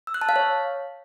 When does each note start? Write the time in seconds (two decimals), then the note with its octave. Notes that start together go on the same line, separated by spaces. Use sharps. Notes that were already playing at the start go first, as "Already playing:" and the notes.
0.07 E6
0.14 F#6
0.22 A5
0.29 F5
0.36 C#5